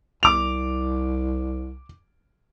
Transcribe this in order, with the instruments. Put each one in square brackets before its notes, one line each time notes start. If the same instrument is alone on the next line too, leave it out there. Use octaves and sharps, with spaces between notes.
[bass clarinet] C2 [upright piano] D6 F7